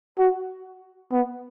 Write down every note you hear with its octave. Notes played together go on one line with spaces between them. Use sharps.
F#4
B3